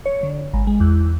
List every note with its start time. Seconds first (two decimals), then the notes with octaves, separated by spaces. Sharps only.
0.06 C#5
0.23 D3
0.53 G#1
0.67 G#3
0.80 E2